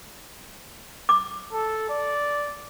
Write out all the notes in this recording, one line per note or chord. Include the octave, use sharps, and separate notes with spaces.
D6
A4
D5